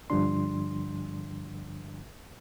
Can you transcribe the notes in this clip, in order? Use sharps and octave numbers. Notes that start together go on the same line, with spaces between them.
G2 D3 F3 G3 D4 C6